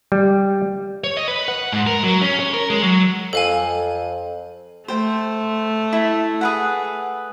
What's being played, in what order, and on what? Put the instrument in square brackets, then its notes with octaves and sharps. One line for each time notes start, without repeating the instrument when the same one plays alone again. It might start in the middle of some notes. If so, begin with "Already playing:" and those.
[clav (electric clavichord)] G3
[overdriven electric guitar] C#5
D#5
B4
F#5
G#2
A#4
F#3
C#4
C#5
A#4
G#3
F#3
[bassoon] F2 [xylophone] A4 F5 G#5
[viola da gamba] A3 [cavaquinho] C5 G5
[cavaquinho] E4
G#4 B4 F#5